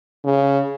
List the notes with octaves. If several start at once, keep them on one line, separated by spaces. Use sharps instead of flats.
C#3